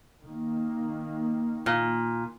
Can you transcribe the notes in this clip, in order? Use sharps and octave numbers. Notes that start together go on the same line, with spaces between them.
D#3 A#3
A#2